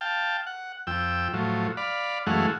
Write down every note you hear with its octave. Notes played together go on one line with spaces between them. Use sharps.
F5 G5 A5
F#5
F2 G5 E6
A2 F3 F#3
D5 F5 B5
F#2 E3 G#3 A3 F5 F#5